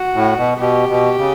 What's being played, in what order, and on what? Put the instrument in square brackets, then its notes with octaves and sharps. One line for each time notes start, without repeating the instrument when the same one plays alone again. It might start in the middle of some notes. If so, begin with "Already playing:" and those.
Already playing: [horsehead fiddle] F#4
[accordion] A2
B2
[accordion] B2 [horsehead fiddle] G4
[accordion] B2
C#3